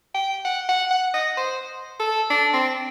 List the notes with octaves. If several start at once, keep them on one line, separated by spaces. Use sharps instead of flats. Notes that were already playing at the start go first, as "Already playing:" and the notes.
G5
F#5
F#5
F#5
D#5
C5
A4
D4
C4